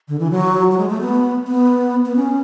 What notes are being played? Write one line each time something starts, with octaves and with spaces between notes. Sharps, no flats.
D3
E3
F#3
F#3
G#3
A3
B3
B3
B3
C#4